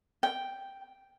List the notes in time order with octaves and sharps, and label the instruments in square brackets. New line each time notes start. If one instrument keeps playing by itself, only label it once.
[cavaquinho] G5